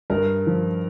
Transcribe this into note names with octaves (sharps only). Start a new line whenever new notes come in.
G2 A#4
F3